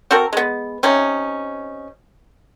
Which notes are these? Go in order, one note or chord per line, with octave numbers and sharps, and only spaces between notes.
C4 F#4 A4 A#4
G#3 B3
C3 C#4 D#4